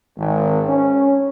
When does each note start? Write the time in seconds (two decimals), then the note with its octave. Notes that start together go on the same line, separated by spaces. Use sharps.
0.17 G#1
0.66 C#4